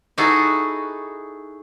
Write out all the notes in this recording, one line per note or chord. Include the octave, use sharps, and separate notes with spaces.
D#4 E4 F#4 G#4 A4